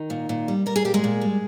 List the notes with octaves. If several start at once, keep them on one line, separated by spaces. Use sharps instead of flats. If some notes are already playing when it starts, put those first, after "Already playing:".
Already playing: D#3 D#4
A#2
A#2
G3
G3 A#4
G#4
A#2 G4
G#3 G#4
A#2
G3